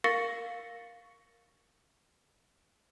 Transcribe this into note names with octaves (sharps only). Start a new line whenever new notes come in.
A#4 F5 C#6 A6 A#6 C#7